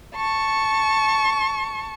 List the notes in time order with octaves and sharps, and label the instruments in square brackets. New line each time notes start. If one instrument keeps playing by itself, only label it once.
[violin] A5 C#6